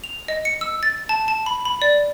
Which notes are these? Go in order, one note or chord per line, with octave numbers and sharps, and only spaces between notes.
F7
D#5
C#7
E6
A6
A5
A5
B5
B5
D5